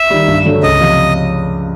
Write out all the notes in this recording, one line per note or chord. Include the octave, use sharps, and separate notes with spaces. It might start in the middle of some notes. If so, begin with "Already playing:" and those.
Already playing: E5
D#3 G3
G2
D3 F#3 A3
C#2 D#5
C3 F3